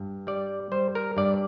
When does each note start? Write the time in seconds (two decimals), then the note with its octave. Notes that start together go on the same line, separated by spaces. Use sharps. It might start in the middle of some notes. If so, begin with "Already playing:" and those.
Already playing: G2
0.27 G3 D5
0.72 G3 C5
0.95 A#4
1.17 G2 D5